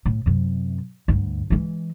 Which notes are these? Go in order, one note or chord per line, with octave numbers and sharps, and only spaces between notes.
A2
F#2 C3
D2 G2
E3 G#3